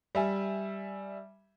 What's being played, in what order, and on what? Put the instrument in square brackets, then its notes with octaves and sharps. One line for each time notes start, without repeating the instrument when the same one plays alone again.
[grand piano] G3 E5 G#5